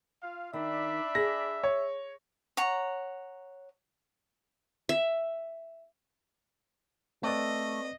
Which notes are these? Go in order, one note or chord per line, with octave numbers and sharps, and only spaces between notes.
F4 F5
D#3 D4 D5 E5 B5
G#4 A#6
C#5
C#5 F#5 A#5
E5
A3 C4 B4 D5 D#5